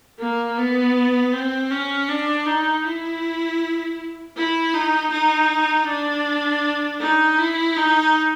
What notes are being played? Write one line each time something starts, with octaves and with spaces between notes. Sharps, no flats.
A#3
B3
C4
C#4
D4
D#4
E4
E4
D#4
D#4
D4
D#4
E4
D#4